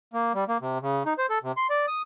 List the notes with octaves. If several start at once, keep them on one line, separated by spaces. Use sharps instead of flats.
A#3
G3
A#3
C3
C#3
D#4
C5
A4
C3
C6
D5
D#6